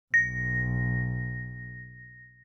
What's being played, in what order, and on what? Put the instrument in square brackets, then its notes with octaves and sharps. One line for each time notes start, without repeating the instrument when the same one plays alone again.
[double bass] B1 [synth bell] A#6